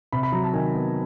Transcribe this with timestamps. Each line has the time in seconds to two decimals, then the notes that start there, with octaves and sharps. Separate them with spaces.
0.12 C3 B5
0.23 B5
0.32 F#3 A#5
0.44 A5
0.53 D#3 G#5
0.75 B3